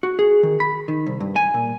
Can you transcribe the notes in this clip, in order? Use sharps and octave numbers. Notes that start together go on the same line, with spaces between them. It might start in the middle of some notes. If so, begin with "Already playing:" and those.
F#4
G#4
D#3
B5
D#3
C2
G2
G#5
A#2